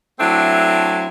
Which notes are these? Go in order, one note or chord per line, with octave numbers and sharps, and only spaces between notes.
F#3 A3 C4 D4 E4 E5